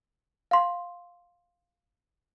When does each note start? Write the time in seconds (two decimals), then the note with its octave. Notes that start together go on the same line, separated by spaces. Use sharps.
0.51 F5 C6